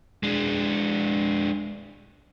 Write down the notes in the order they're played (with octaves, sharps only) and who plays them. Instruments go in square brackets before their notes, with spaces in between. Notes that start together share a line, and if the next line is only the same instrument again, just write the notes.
[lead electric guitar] G#3 D4